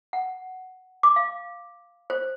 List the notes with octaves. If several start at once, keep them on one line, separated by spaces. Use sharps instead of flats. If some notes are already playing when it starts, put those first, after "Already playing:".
F#5
D6
F5
C5